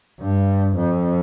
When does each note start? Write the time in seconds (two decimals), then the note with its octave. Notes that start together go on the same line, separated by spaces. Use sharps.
0.20 G2
0.76 F2